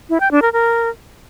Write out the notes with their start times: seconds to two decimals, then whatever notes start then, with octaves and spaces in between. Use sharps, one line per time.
0.10 E4
0.20 G5
0.31 D4
0.42 A#4
0.53 A#4